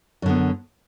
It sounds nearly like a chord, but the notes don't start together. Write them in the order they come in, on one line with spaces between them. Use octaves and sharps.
F#2 D3 B3